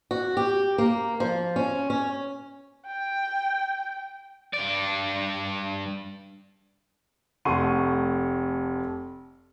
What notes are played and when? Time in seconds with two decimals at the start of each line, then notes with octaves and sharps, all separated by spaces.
0.11 F#4
0.37 G4
0.78 A#3
1.20 F3
1.56 C#4
1.90 C#4
2.86 G5
4.53 G2 D5
7.45 F1 A3 F#5 C6 C#6 D#7